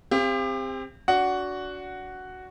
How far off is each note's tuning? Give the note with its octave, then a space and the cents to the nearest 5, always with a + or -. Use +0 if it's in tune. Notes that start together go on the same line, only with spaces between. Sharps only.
C4 +0 G4 +35 F5 -25
D4 -25 F#4 +0 F#5 +5